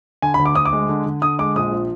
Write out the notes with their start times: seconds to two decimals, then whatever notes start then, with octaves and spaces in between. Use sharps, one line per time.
0.22 D3 G#5
0.34 B5
0.39 D2
0.46 D6
0.55 D2 D#6
0.65 D6
0.73 G#3
0.89 D3
1.06 D3
1.22 D3 D#6
1.39 G#3 D6
1.55 A#1 D#6
1.72 F3